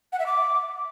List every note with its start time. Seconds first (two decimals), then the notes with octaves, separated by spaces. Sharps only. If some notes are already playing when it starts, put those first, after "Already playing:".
0.13 F#5
0.19 E5
0.26 D6